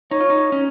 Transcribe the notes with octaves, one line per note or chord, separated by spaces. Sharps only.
D#4 C#5
F4
D#4
C#4